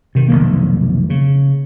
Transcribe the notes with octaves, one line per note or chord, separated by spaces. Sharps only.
C3 D#3
F1 B1 D#3 A#3
C#3